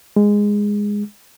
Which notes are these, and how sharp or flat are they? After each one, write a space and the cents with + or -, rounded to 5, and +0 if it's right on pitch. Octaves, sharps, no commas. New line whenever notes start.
G#3 -10